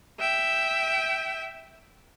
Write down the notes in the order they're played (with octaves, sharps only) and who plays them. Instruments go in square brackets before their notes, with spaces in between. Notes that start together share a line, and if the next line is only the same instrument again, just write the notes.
[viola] E5 G5